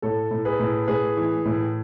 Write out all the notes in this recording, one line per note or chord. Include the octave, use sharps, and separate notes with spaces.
A2 A4 C#5
A2
G#4 B4
A2
A2 G#4 B4
E3
A2